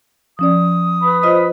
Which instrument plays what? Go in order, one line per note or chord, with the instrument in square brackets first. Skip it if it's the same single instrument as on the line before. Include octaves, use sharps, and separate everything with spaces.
[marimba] F3 C#4 D5 [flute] D#6
[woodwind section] B4 B5
[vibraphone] F4 C5 D#5